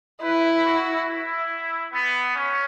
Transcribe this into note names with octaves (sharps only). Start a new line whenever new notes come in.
E4 B4
F#4
E4
B3
C#4